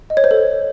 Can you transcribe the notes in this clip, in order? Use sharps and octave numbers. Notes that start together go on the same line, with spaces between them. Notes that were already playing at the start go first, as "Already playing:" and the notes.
D#5
C#5
C5
A4